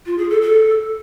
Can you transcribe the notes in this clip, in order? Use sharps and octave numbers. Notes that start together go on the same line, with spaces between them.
F4
G#4
A4
A4